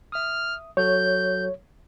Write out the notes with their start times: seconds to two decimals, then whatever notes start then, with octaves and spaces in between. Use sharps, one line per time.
0.12 E5 D#6 F6
0.77 F#3 F#4 A4 C#5 G6